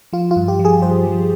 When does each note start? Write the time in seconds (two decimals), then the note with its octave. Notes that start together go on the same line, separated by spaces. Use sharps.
0.13 F3 F4
0.31 F4
0.36 G2
0.48 G4
0.59 F3
0.65 G#4
0.82 G2 C5
1.07 F3